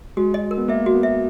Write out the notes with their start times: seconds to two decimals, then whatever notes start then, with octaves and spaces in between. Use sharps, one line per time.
0.17 G#3 F#4
0.34 D#5
0.51 A#4
0.57 B3
0.68 A#3 E5
0.86 F#4
0.94 B3
1.03 E5